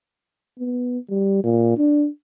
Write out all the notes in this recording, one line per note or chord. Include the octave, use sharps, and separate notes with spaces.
B3
G3
A#2
D4